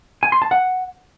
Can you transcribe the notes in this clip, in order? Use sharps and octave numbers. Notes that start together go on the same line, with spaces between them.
G#5
C6
A5
F#5